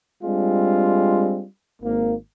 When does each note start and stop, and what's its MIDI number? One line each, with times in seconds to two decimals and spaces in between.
0.23 1.44 55
0.23 1.44 56
0.23 1.44 60
0.23 1.44 62
0.23 1.44 65
1.82 2.14 32
1.82 2.14 58